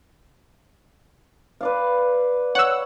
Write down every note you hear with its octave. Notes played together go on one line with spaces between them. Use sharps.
B4 D5 F5
C#5 F#5 E6